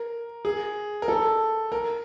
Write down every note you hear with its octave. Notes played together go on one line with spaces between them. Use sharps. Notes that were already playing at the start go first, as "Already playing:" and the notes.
Already playing: A#4
G#4
A#4
A4
A#4